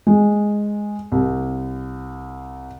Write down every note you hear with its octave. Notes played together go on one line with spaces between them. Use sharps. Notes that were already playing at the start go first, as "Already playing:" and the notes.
G#3
C2